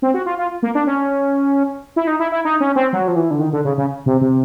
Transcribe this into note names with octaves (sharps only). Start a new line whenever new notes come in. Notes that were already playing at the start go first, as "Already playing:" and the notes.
C4
F#4
F4
F4
A#3
D4
C#4
E4
D#4
E4
E4
D#4
C#4
C4
F#3
F3
E3
D3
D#3
D3
C#3
C#3
C3
C3